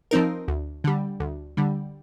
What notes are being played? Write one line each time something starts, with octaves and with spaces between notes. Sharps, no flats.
F3 C4 D#4 A#4
D2
D3 G3
D2
D3 G3